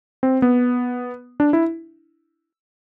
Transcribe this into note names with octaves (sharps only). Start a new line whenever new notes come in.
C4
B3
D4
E4